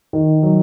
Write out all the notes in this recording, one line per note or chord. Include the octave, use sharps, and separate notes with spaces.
D#3
F#3